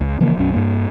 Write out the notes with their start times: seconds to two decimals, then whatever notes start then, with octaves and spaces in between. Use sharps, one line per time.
0.01 C#2
0.20 C#3 E3 F3 A#3
0.38 B1 F#2 C#4
0.54 G2 A#3